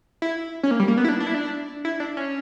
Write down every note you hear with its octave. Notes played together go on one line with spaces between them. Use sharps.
E4
C#4
A#3
G3
A#3
B3
E4
D4
D4
E4
D4
E4
D4
C#4